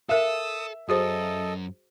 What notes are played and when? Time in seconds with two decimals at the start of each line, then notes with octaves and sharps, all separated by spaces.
0.09 A4 A#4 E5 F5 D#6 E6
0.89 F#2 F#4 G#4 A4 C5 D#5